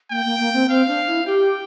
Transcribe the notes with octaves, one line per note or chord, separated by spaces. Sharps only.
A#3 G5
A#3
A#3
C4
C4 F5
D4
E4
G4 G5